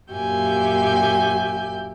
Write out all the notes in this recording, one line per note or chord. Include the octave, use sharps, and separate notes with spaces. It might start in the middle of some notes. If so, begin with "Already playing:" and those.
F#2 A#2 G4 E5 G#5 G6